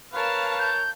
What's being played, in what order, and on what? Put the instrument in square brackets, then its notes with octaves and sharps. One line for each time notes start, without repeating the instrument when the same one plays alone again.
[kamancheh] A#4 C#5 [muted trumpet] B4 [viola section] F5 A5
[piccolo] G6